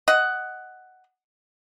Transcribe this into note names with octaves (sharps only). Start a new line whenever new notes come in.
D#5 F#5